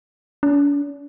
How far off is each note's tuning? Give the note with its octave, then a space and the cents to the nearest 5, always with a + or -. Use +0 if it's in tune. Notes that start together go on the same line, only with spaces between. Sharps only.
D4 -45